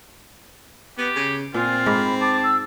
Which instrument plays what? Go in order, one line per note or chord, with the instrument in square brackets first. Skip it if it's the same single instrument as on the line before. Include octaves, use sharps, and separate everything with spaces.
[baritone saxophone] B3 [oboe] G4
[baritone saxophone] C#3
[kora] A#2 [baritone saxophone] C4 [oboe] F4 [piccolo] G#5
[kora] G#2 [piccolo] B5
[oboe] A5 [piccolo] D6
[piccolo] E6